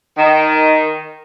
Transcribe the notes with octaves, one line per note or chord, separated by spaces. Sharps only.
D#3